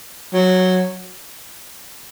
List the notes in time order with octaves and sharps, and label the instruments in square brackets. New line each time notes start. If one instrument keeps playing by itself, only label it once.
[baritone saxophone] F#3